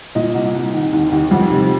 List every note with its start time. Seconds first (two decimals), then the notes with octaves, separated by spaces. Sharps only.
0.15 A#2 D#5
0.34 C2
0.55 C2
0.74 D#3
0.93 D#2
1.12 D#2
1.31 F2
1.51 C3